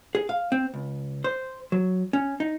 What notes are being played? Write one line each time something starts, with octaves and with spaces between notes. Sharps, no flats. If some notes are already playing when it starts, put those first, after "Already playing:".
G#4
F5
C4
C#2
C5
F#3
C#4
D#4